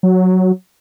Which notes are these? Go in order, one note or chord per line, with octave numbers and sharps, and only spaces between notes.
F#3